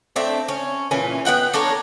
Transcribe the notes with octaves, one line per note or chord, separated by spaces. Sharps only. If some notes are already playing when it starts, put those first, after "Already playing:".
A3 C4 D4 E5
C#4
A#2 E3 C#4
B3 D4 F#5 G5
D4 A4 A#4 C#5